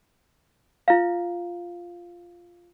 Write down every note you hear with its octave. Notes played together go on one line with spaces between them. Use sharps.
F4 F5